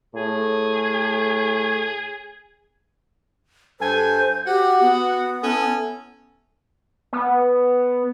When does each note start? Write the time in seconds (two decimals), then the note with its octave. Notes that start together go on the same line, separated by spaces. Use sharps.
0.15 A2 G#4
3.80 G2 A4 C5 G#5
4.46 F#4 G4 F#5
4.81 B3
5.43 C#4 E4 A4
7.13 B3